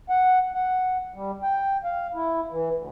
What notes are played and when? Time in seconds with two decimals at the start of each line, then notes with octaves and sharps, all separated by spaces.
0.10 F#5
0.54 F#5
1.14 G3
1.42 G5
1.84 F5
2.14 E4
2.51 E3
2.75 D2